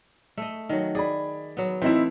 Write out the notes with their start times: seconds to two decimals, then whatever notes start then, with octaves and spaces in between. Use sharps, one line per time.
0.37 A3 D#5
0.69 D#3 F#3
0.95 G#4 D5 B5
1.57 F#3 B3
1.82 E3 A3 C4 D#4 E4